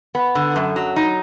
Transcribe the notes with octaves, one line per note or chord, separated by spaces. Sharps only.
B3
D3
F#2
F#3
D#4